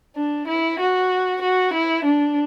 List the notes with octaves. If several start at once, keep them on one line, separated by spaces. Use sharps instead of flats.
D4
E4
F#4
F#4
E4
D4